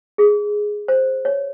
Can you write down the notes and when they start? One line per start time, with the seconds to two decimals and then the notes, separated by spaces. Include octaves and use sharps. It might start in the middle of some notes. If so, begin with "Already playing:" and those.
0.18 G#4
0.88 C5
1.25 C#5